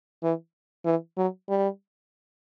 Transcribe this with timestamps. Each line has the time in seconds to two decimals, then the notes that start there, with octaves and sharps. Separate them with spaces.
0.23 E3
0.85 E3
1.17 F#3
1.49 G3